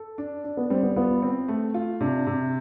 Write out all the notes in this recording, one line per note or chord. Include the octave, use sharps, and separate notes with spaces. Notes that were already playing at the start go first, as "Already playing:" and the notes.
Already playing: A4
D4
D4
B3
G3 C4
B3
B3 F4
C4
A3
F4
C3 D4
C3